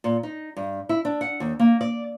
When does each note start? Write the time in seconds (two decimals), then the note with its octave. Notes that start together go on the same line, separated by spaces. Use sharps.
0.04 A#2
0.23 D#4
0.57 G2
0.89 E4
1.05 D4
1.21 F#5
1.40 D#2
1.59 A#3
1.81 D5